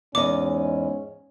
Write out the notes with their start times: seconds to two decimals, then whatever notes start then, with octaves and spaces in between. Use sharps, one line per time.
0.15 E2 G#2 C#4 D#5 D6